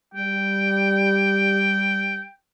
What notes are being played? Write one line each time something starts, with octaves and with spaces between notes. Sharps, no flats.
G3 G5